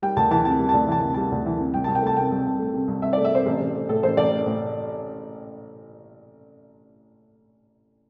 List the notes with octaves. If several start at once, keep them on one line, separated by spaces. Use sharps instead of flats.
G3 G5
D2 A5
E3 A5
C3 A5
G3
D2 A5
E3 A5
C3
G3 A5
D2
E3
C3
C2 G5
C2 A5
G5
A3 A5
C3 G5
C2
C2
A3
C3
C2
C2 E5
D5
A3
E5
C3 C5
A1
A1
A3
A2 A4
A1 C5
A1 D5
A3
A2